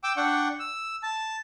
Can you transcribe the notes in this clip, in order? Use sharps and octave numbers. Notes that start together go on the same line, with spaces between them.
G5 D6 E6
D4 F#5 G5 C#6
E6
A5